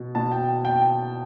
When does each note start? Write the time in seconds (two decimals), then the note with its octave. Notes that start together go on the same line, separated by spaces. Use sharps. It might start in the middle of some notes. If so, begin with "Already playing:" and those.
Already playing: B2
0.15 B2 A5
0.32 G5
0.65 G5